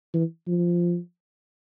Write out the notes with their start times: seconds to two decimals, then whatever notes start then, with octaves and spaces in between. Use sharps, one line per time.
0.14 E3
0.47 F3